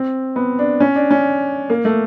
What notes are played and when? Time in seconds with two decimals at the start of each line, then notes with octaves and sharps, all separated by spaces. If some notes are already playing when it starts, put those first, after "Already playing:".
Already playing: C4
0.36 B3
0.59 D4
0.80 C#4
0.96 D4
1.11 C#4
1.70 A#3
1.85 A3